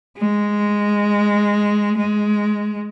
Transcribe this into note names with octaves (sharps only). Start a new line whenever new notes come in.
G#3
G#3